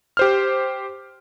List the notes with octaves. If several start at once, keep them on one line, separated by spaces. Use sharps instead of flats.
G4 C5 F6